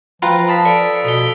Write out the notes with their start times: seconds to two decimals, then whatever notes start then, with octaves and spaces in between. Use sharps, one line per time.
0.22 F3 F4 B4 G5 A#5
0.48 F5 A5 D#6 A6 B6
0.65 A4 D5 F5 C#7 D7
1.05 B2 A4 D#6 C#7 G7